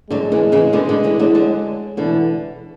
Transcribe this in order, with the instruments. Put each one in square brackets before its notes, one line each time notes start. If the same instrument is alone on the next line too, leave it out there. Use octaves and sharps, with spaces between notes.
[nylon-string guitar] D3 F#3 [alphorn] G#3
[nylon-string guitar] C#3 E3
C#3 E3
B2 D3
B2 D3
C#3 E3
D3 F#3
D3 F#3
[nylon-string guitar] B2 D3 [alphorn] E3